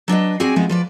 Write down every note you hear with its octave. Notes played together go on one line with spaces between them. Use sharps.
F#3 D4 B4 D#5
C4 F#4 G#4 D5 G#5
F3 G#3 B3 E4
F3 B4 D5